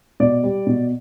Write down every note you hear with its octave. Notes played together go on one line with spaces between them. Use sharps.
B2 D5
G3
B2